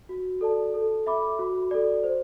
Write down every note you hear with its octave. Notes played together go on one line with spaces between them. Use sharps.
F#4
A4 D5 A5
A4
E5 B5 D6
F#4
A4 D5
C5